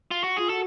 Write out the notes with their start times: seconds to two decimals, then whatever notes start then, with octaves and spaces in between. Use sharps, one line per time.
0.11 F4
0.24 F#4
0.37 F4 G#4
0.49 F#4 A4